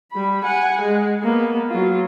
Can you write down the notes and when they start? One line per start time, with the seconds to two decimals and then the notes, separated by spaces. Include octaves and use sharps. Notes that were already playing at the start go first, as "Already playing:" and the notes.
0.12 G3 B5
0.44 F#5 G#5
0.81 G#3
1.23 A#3 B3
1.70 F#3 F4